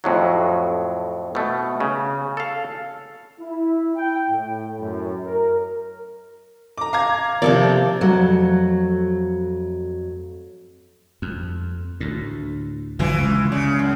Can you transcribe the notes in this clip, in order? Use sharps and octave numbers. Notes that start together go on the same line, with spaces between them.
F2 A2 F#3
B2 A3
C#3
A4 F5
E4
G5
A2
F#2
A#4
A#5 D6
F5 A#5 G#6
C3 F3 A#3 A4 D5
F2 F#3 A3
F2
D2 A2
F#1 D3 E3 F#3 F4
C#2
C#3
F#2